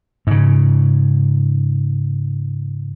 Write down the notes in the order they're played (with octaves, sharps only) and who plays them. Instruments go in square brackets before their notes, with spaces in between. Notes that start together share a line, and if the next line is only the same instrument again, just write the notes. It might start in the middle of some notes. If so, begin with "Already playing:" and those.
[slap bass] G#2 C#3